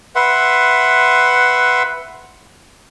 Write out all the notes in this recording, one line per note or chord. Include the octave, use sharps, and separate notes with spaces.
B4 E5 F#5 C6